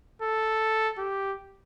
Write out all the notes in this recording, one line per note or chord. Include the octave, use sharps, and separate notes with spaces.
A4
G4